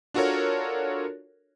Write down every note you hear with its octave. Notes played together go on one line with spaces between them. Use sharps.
D4 F4 F#4 A4 A#4 C#5